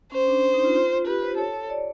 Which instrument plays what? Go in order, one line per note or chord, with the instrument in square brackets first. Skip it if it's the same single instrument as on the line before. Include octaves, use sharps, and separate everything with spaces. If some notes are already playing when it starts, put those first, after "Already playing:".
[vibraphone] C#4 [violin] C5
[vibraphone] D4
D4
D#4
F4
F4
[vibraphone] G4 [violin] B4
[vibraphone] C5
[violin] A4 [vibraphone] C#5
[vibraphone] C#5
D5